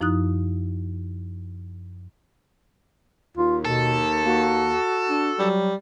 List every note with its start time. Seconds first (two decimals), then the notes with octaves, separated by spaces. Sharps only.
0.01 F#2 F3 D#4 E4 D#6 F#6
3.37 D#2 F4
3.65 B2 A4
4.25 A#3 F#4
5.08 D4
5.39 F#3 G3